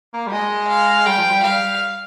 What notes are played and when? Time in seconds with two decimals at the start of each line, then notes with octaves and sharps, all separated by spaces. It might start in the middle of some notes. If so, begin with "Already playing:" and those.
0.13 A#3
0.27 G3
0.32 G#3 D#5
0.69 F5
1.06 G3 G5
1.18 F3
1.31 G3
1.44 G3 F5